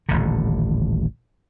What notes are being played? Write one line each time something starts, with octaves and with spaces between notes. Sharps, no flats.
D#1 A1 D3